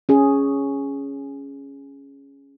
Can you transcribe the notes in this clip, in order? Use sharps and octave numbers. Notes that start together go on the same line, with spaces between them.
C#4 G#4